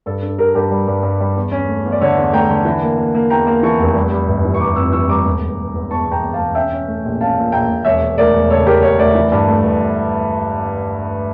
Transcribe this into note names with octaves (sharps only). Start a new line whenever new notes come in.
G2 A4
D4 A4
G2 G4 A#4
G2 G4 A#4
G3
G2
G2
G3
E2
C#4
A3
E2
D5
D3 A4 C#5
E2
A3 G5 A#5
D3
E3
A#3
A#3
A#3
E2 G5 A#5
A#3
E3 A5 C#6
F1
G3
G3
G1
E3
C#6
G1 A#5 D6
F2 C#6 E6
E3 C#6 E6
G3 A#5 D6
E1
E1
E1
E2
E2 A5 C#6
C#6
E1 G5 A#5
E1
F5 A5
E1
C#4 E5 G5
C#4
A3
A#1
C#4 F5 A5
A#2
A#1 G5 A#5
A#1
E1 C#5 E5
E1
D2 A#4 D5
E1
C#3 A4 C#5
E1 G4 A#4
E1 A4 C#5
D2 A#4 D5
E3
G2
A3
G1